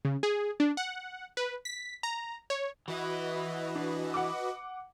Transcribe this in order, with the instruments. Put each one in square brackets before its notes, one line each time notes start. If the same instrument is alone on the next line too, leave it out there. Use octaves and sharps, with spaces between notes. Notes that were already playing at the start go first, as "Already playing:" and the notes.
[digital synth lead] C#3
G#4
D4
F#5
B4
B6
A#5
C#5
[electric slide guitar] E3 E4 [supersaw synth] F#4 B4 D#5
[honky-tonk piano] D4
F#5 D6